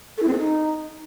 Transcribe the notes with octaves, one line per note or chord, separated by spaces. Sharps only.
A4
E4
C4
A4
D#4